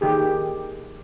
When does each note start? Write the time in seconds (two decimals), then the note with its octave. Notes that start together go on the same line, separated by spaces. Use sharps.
0.01 D#3 G4 G#4